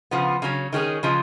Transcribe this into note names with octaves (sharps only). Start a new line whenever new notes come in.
C#3 F3 B3
C#3 F#3 C#4
D#3 G#3 C#4 G#4
C#3 F3 G#3